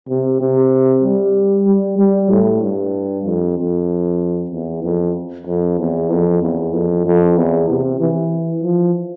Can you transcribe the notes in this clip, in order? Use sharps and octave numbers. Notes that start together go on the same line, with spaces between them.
C3
C3
G3
G3
G3
A2
G2
F2
F2
E2
F2
F2
E2
F2
E2
F2
F2
E2
C3
E3
F3